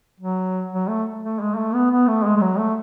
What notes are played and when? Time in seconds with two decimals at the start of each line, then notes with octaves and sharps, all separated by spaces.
0.20 F#3
0.72 F#3
0.88 A3
1.23 A3
1.40 G#3
1.56 A3
1.74 B3
1.91 B3
2.08 A3
2.25 G#3
2.37 G#3
2.41 F#3
2.59 A3